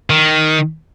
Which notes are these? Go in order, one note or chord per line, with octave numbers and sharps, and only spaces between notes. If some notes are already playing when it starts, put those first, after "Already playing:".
D#3